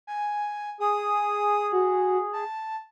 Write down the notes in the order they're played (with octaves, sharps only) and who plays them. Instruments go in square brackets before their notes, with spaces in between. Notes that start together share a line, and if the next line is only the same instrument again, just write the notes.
[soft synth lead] G#5
[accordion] G#4 [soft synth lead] D#6
[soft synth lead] F#4
A5